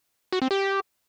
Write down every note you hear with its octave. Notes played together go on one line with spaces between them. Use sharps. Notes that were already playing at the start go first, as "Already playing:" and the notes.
F#4
C4
G4